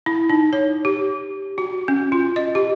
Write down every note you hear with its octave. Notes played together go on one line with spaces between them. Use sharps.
E4
D#4
C#5
G4
F#4
C#4
F4
D#5
G4